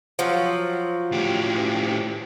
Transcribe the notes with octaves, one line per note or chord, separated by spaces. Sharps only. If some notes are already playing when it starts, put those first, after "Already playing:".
F3 F#3
A2 G4